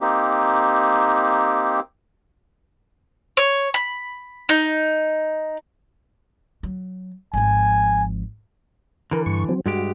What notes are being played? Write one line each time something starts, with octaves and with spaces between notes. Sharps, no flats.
A#3 C4 D#4 G4
C#5
B5
D#4
F#3
G#1 F3 G#5
D3 E3 A#4
G2 C#6
F#3 C4
G2 G#3 F#4 G4